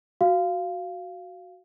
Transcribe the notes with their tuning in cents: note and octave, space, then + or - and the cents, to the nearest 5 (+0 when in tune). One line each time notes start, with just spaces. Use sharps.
F#4 +0 F5 -10